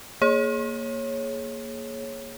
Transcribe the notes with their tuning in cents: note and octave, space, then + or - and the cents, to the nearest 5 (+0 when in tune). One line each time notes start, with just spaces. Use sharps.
A#3 +0 G#4 +10 C#5 -15